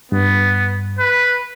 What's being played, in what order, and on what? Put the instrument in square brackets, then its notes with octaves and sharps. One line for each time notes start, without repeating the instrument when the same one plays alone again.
[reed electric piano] G2 [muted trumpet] B3
[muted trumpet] B4